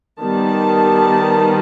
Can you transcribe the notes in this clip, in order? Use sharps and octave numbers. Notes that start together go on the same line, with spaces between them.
D#3 G3 B3 A5